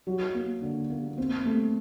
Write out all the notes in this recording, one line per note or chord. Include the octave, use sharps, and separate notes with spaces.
F#3
A#3
D3
A#3
C4
A3